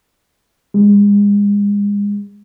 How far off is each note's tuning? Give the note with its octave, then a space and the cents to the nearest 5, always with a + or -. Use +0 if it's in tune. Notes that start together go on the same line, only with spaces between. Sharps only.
G#3 -35